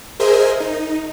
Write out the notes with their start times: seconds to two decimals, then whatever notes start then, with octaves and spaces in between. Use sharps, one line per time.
0.19 G#4 A#4 C5 D#5 E5 G#5
0.60 D#4